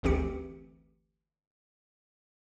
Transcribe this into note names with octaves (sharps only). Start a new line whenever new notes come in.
G1 D2 E3 C4 G4 C#7